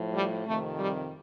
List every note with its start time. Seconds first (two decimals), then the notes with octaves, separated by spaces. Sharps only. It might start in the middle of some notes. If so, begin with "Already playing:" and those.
Already playing: A2 F3
0.13 G3
0.46 F2 C3 D#3 A3
0.78 G3